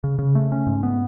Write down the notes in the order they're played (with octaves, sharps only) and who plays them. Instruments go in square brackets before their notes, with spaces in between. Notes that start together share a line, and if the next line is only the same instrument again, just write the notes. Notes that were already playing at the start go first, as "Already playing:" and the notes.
[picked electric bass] C#3
C#3
A3
C#4
G#2
B3